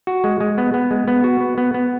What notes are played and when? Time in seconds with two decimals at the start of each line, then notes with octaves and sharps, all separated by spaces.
0.07 F#4
0.24 G#3
0.40 G#3
0.58 B3
0.74 B3
0.91 G#3
1.08 B3
1.24 F#4
1.41 B3
1.58 B3
1.74 B3